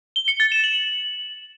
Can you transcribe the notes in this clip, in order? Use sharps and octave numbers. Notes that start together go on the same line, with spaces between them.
G7
C#7
A6
E7
F#7